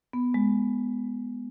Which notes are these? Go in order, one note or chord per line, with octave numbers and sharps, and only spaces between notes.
B3
G#3